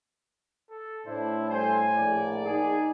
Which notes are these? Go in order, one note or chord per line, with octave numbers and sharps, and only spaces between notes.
A4
A2 D4 E4 C5
G3 A4 C5 G#5
A#1 A#3 D5
D#4 G#4